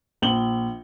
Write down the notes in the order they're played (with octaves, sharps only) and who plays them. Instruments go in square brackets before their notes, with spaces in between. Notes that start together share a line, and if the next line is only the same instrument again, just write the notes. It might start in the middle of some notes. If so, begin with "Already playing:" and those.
[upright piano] A#1 F#7 G7